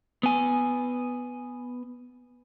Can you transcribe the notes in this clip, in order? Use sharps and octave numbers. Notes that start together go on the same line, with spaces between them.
B3 G#5